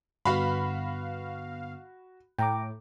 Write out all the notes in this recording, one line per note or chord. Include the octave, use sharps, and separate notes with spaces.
G2 D3 B3 F#4 F5 B5
A2 G5 A#5 D6